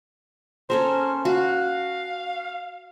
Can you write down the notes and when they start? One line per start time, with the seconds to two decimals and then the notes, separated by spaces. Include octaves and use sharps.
0.70 C#4 A4 A#4 C5
1.25 F#4 F5